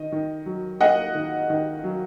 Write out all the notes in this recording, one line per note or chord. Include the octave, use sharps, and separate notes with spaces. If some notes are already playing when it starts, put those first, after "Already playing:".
Already playing: D#3 D#5
D#3
F#3
A#3 D#5 F#5
D#3
D#3
F#3